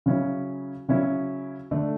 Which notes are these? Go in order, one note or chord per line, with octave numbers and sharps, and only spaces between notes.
C#3 F#3 C#4 E4
C#3 F#3 C#4 E4
D3 A3 D4